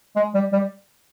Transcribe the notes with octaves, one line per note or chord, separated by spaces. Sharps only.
G#3
G3
G3